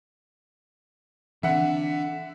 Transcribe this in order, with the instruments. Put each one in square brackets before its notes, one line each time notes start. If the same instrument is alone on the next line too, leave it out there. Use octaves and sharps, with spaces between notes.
[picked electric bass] D3 [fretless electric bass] E3 C4 [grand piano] E5 F#5